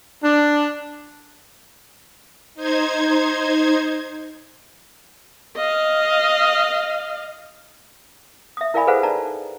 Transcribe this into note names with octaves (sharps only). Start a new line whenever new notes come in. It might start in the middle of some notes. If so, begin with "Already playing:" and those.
D4
D#4 C5 G#6
D#5 F5
E5 D#6
E4 A#4 D5 F5 G#5 B5
G#4 A4 B4 C5 F5 F#5
D#4 D5 A5 A#5